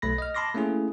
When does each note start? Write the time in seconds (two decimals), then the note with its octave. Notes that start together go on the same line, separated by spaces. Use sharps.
0.02 B1 A3 B5 A#6
0.18 D#5 F6
0.35 A5 B5 C6 D6 A#6
0.55 A3 A#3 C#4 E4 G#4